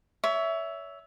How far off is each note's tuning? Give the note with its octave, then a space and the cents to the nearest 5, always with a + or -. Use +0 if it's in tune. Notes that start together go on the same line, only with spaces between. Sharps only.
C#5 +30 E5 +0